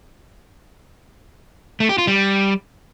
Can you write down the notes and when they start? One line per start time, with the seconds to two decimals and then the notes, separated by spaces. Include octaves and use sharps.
1.80 A3
1.89 G4
1.98 F4
2.07 G3